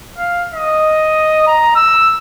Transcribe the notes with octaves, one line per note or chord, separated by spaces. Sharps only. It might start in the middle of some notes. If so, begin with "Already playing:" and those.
F5
D#5
A#5
E6